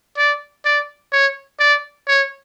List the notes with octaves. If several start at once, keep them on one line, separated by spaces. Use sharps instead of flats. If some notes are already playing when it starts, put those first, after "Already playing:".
D5
D5
C#5
D5
C#5